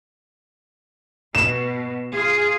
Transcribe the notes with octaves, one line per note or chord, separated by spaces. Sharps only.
B2 E7
F4 G#4